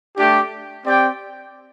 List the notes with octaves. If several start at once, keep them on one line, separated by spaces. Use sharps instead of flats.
A3 D4 G4
C4 G4 D5 G5